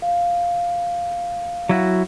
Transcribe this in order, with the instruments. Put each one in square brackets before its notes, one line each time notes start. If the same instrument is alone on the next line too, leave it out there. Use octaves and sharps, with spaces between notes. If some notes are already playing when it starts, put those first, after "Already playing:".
[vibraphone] F5
[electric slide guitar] F#3 E4 F#4